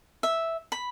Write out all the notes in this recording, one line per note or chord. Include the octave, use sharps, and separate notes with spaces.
E5
B5